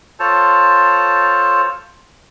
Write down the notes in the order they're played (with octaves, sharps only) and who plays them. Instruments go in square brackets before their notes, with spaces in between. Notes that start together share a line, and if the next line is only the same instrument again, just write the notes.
[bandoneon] F4 A4 C5 C#5 A5